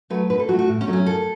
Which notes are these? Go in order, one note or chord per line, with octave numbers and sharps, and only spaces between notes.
F#3 A3 B4
B2 B4
A4
F#3 F#4
A3
F#4
A2
C#4
F#3 A3
C#4
F#2 A4